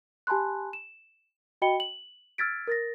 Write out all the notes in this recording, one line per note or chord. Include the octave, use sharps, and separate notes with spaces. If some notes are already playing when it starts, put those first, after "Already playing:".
G4 G#5 A5 B5 C6 F#6
E7
F#4 D#5 G5 B5 C#7 G7
F#7
E6 F6 G#6 A6 B6 D7
A#4 A6 A#6